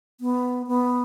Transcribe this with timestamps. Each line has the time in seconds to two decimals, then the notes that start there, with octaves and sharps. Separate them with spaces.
0.21 B3
0.67 B3